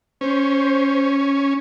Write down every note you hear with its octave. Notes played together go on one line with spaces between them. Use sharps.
C#4 C5